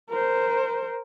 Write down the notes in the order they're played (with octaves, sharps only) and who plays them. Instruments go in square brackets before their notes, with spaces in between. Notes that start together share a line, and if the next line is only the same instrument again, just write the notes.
[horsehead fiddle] A#4 C5